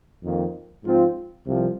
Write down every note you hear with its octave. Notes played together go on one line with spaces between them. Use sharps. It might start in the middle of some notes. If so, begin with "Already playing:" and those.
F2 D#3 A#3
G#2 F3 C4 F4
C2 C3 F3